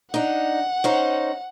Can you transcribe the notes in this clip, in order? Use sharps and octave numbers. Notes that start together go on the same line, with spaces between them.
D4 D#4 F#5
C#4 D#4 C5